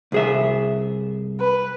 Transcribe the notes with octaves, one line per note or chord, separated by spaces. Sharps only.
C2 G#4 E5
B4